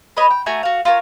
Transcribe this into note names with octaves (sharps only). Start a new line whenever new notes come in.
B4 C#5 D#5
G5
A3 F#4 G#5 A#5
F#4 F5
F4 A4 A#4 C#5